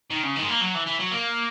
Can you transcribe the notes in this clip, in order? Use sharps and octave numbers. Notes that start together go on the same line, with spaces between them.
D#3
C#3
D#3
G#3
A#3
F#3
E3
E3
F#3
A#3